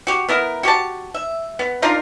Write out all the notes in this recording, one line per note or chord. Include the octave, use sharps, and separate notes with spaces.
F#4 G4
B3 E4 A#4
F#4 G4 C5 A5
E5
B3
D4 D#4 F4 A#4